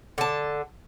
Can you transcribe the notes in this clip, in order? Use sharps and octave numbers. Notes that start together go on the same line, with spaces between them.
D3 A5